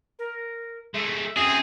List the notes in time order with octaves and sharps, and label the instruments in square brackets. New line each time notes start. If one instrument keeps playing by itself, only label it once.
[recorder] A#4
[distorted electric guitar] G#3 A3 [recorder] E5
[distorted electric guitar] F#2 C4 [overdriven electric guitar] G#4